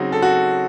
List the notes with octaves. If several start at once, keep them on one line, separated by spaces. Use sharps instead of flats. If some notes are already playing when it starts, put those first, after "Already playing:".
Already playing: C#3 F#3 C4 D#4 F#4
A4
F#4